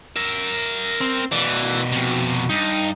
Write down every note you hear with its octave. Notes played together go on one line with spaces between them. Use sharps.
A#4 E5
C4
B2 E3 D5
F2 C3
G2 D#4